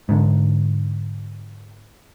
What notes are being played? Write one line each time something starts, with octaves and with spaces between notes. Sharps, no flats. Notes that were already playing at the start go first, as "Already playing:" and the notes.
G#2 D3